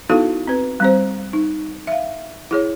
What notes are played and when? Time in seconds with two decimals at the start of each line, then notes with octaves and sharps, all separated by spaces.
0.09 B3 D#4 E4 F#4 A4 F5
0.47 C4 B4
0.80 G3 C4 C5
1.33 D#4
1.87 E5 F5
2.51 E4 G#4 C#5